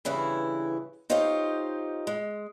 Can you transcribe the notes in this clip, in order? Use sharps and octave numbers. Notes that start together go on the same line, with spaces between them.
G2 C#3 E3 E4
D#4 F4 G4 C5 C#5 D#5
G#3